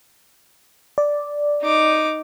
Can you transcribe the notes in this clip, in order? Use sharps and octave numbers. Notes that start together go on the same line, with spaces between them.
D5
D#4 D6